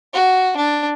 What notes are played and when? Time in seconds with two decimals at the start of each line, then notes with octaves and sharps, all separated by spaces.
0.14 F#4
0.57 D4